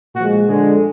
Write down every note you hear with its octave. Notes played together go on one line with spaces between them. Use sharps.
A#2 F3 G#3 F#4
D3 G#3